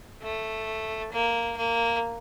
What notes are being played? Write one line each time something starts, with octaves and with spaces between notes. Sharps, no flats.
A3
A#3
A#3